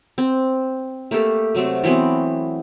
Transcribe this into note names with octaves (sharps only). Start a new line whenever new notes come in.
C4
A3 A#3 G4 A4
C3 F#3 A3 C4
E3 F#3 B3 C4